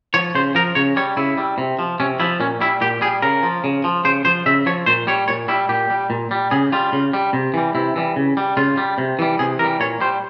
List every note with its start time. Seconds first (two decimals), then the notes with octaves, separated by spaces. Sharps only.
0.14 F3 C#5
0.35 C#3 C5
0.55 F3 A#4
0.75 C#3 C#5
0.96 G3 C#5
1.17 C#3 E4
1.38 G3
1.58 C3
1.79 F3
2.00 C3 C#4
2.20 F3 E4
2.40 A#2 C#4
2.61 G3 E4
2.81 A#2 G4
3.01 G3 G#4
3.22 C#3 A#4
3.43 F3
3.64 C#3
3.84 F3
4.05 C#3 C5
4.25 F3 C5
4.46 C#3 E5
4.66 F3 C#5
4.86 A#2 C5
5.07 G3 C#5
5.28 A#2 C#5
5.48 G3 E4
5.69 A#2 G4
5.90 G3
6.10 A#2
6.31 G3
6.51 C#3 G#4
6.72 G3 F4
6.93 C#3
7.13 G3
7.33 C3
7.54 E3 G3
7.75 C3 E4
7.96 E3 G3
8.16 C#3
8.37 G3
8.57 C#3 F4
8.77 G3
8.98 C3
9.19 E3 G3
9.39 C3 G#4
9.59 E3 G3 A#4
9.80 A#2 C#5
10.01 G3 C5